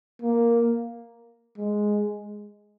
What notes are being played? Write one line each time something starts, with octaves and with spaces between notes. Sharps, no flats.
A#3
G#3